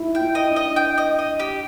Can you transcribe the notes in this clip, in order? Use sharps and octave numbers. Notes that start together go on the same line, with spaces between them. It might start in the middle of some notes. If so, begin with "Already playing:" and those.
Already playing: D#4 E4
G5
E4
D#5
D4
D#5
G5
D#5
D#5
G4